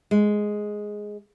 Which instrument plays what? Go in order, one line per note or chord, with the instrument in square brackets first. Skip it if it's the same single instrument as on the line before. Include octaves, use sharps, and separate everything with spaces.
[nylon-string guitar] G#3